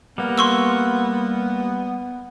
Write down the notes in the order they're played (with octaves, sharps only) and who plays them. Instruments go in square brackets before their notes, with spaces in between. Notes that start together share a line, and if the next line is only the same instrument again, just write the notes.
[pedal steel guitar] G3 A#3 [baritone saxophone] B3
[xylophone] C6 C#6 E6